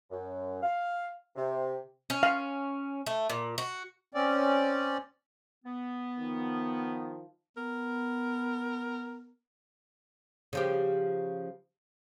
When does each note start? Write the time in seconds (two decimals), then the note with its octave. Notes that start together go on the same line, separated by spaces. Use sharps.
0.10 F#2
0.62 F5
1.36 C3
2.10 C#4
2.23 F5
3.06 A3
3.30 A#2
3.58 F#4
4.14 C4 C#4 D5
5.65 B3
6.19 D#3 F3
7.57 B3 A#4
10.53 C#3 F3 G4